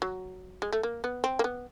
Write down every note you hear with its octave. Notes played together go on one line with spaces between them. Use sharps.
F#3
G#3
A3
A#3
B3
C4
A#3
B3